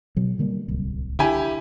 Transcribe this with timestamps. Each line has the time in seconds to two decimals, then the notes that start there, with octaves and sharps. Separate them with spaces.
0.16 B2 F#3
0.39 D3 G3 A#3
0.68 D1 C2
1.19 D3 E4 G4 G#5